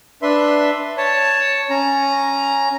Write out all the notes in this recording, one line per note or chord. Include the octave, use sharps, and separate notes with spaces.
D4 B4 E5 C6
C#5 A5
C#4 A#5